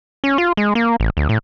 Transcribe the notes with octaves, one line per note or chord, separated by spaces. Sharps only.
C#4
F4
G#3
A#3
A1
D2
A2